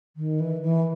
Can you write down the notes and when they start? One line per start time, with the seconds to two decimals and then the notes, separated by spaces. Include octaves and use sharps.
0.17 D#3
0.40 E3
0.62 E3